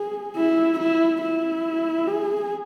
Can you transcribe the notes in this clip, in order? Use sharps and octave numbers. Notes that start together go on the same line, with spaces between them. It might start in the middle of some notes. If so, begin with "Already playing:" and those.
Already playing: G#4
E4
E4
E4
G#4